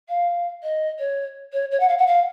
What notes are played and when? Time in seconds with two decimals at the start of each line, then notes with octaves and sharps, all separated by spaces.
0.09 F5
0.63 D#5
0.99 C#5
1.52 C#5
1.71 C#5
1.79 F#5
1.88 F5
1.98 F#5
2.06 F5